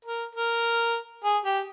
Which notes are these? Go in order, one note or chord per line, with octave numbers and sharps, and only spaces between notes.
A#4
A#4
G#4
G4